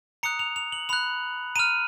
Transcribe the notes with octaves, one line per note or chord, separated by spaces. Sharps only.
A#5 D#6 F#6 C#7
F7
F7
F#7
B5 F#6 F7
A#5 F6 D#7